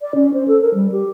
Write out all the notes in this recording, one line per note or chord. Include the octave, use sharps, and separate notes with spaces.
D5
C#4
C5
A4
A#4
G3
G4